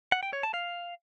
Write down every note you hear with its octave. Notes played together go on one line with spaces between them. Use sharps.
F#5
G5
C#5
A5
F5